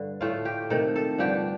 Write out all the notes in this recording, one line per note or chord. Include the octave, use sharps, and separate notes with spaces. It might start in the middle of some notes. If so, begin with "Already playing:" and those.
Already playing: G2 D3
A2 A3 F4
G4
C3 D#3 A3 A4
A4
G2 D3 F3 G4